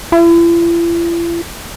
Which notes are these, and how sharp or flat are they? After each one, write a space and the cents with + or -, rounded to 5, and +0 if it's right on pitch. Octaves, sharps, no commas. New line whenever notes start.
E4 +45